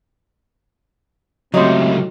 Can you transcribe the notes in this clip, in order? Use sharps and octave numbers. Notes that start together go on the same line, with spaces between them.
C#2 A2 F#3 A3 C4 G4 D#5 C6